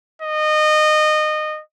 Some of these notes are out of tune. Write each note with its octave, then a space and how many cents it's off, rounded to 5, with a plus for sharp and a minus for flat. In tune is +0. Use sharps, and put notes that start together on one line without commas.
D#5 -25